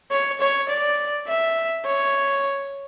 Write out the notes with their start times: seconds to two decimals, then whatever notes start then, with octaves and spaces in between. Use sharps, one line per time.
0.11 C#5
0.41 C#5
0.69 D5
1.27 E5
1.85 C#5